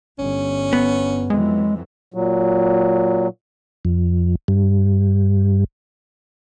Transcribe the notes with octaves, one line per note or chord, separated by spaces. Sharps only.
G1 C#4
B3
F2 E3 F#3 G#3
A#2 F#3
F2
G2